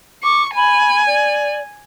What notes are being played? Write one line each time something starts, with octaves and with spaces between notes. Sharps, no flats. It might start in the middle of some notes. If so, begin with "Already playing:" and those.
C#6 D6
G#5 B5
D5